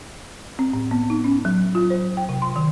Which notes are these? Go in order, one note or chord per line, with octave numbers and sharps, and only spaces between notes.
C4
A2
B3
D#4
C#4
F#3
F4
C5
G5
C3
C6
D#3